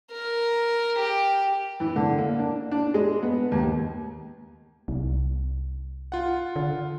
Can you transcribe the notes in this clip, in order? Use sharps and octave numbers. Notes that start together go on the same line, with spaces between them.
A#4
G4
E3
D3
A#3
D4
D4
G#3
B3
D#2
C2
F4 F#5
D3